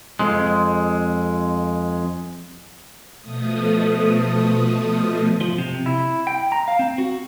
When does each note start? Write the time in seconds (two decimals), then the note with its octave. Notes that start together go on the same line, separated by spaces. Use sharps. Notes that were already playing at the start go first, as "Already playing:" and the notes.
0.19 F2 G#3
3.21 B2 F3 A3 D#6
5.41 F3
5.58 C3
5.86 E4
6.27 G5
6.52 A#5
6.68 F5
6.79 C4
6.98 F#4